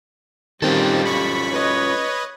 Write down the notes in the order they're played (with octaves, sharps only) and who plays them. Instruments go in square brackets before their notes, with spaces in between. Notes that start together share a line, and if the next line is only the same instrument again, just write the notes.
[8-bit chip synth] D#3 C4 [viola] G3 [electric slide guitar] C#4 F4 A4
[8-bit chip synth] B5 C#6 B6
[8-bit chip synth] B4 D#5 [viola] C#5